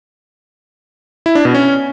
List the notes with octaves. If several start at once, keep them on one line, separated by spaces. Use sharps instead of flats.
E4
D4
B2
C#4